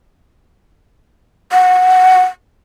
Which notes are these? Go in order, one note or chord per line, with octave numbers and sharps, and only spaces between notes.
F#5